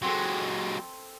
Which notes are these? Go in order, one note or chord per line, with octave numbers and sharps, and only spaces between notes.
F#3 G#3 C4 A4